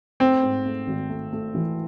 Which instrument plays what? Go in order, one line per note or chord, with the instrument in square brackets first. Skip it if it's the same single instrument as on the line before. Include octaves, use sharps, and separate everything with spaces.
[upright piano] A3 [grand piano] C4
[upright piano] G#2
A3
G#1
A3
A3
E3